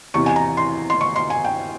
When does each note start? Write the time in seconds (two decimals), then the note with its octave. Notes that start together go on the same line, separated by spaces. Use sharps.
0.14 E2 C3 E3 C#6
0.26 G#5
0.36 A#5
0.57 C6
0.90 C6
1.01 C#6
1.16 C6
1.30 G#5
1.44 G5